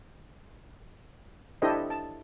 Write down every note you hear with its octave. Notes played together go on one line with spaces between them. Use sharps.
D4 E4 G4 A4 C5 D#5
A5